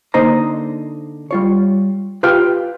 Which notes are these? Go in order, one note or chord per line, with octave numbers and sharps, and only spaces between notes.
D3 A#3 D#4 C5 D#5 A#5
G3 F4 C#5
F4 G4 B4 F5 G5